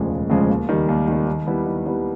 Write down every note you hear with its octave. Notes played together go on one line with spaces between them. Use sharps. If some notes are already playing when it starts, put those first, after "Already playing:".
Already playing: E1 D2 C#3 F3 G#3
E1
D2 C#3 F3 G#3
D#2
D#3 G3
D#2
D#3 G3
D#3
G3 B3 E4
D#3
G3 B3 E4